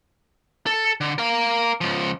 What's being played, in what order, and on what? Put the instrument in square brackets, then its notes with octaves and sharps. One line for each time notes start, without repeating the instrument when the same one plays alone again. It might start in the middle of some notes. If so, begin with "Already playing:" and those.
[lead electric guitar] A4
D3
A#4 F5
C#2 F3